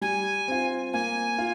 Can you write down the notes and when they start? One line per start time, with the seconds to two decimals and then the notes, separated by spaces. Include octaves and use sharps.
0.01 G3 G#5
0.48 C4 F4
0.93 A#3 G#5
1.38 F4